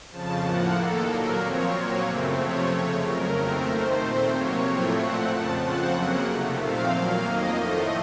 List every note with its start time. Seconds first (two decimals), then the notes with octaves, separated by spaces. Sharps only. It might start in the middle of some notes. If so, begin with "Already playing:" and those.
0.10 F2 C#3 F3 A5
0.43 A2 F3 A#3 F#5
0.75 D#2 D#3 A#3 A4
1.07 A#2 F#3 A#3 A#4
1.40 A#2 F3 C4 C#5
1.73 A#2 F#3 A#3
2.05 F#2 C#3 A3 C4
2.37 C3 F3 A3 C4 C#5
2.70 F2 C#3 A3
3.02 F2 C#3 F#3 A#4
3.34 D#2 D#3 A3 C4 A#4
3.66 D#2 D#3 A3 C5
3.99 A#2 A3 C4
4.31 C3 F#3 A#3 C#5
4.64 A2 F3 A3 C4
4.96 A#2 A3 C4 F#5
5.29 F2 C#3 F3 A5
5.60 F2 C#3 F3 C4 F#5
5.94 F#2 C#3 F#3 A#3
6.26 C3 D#3 A3
6.58 A#2 F3 A3 C4 F5
6.90 A#2 F#3 A#3
7.23 F2 D#3 A#3 D#5
7.55 A2 F3 A3 D#5